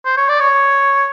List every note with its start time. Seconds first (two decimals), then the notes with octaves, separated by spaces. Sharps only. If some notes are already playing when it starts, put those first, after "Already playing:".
0.06 C5
0.17 C#5
0.29 D5
0.40 C#5